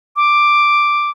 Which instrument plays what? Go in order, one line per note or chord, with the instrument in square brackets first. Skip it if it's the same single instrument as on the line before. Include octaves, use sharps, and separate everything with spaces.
[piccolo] D6